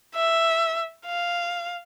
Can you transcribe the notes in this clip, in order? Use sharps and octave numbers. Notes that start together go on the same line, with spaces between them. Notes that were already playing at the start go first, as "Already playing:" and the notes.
E5
F5